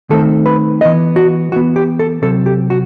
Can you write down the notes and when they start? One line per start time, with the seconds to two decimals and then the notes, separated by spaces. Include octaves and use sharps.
0.10 D#3 A3 C4 A4
0.46 B4
0.81 E3 B3 D#5
1.16 F#4
1.52 E3 B3 F#4
1.76 G4
1.99 A4
2.22 C3 F#3 C4 A4
2.46 G4
2.70 F#4